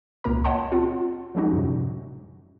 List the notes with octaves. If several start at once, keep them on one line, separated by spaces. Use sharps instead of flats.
C#2 A#2 A#3 A#4 A#5
C#5 D#5 F#5 G5 A5 C6
C4 F4 F#5
F3 G3 G#3 C#4 D#4 F#4
F#2 A2 C3